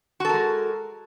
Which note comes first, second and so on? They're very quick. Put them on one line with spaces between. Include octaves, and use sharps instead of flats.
F#4 A4 A#4 G#3